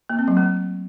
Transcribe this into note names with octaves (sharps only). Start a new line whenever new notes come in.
A#3
C4
F#3
A3